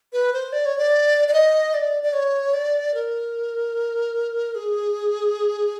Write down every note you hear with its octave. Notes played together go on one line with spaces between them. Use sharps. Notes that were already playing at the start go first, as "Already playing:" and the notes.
B4
C5
D5
C#5
D5
D5
D#5
D5
D5
C#5
D5
A#4
G#4